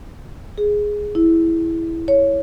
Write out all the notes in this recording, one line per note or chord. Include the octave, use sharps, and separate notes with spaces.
G#4
E4
C#5